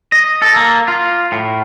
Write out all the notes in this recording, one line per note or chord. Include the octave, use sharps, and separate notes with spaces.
D#5
A4
A#3
F4
A2